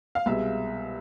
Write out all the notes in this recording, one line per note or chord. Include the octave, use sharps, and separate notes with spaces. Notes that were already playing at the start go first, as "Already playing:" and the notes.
F5
C2 B2 G#3 E5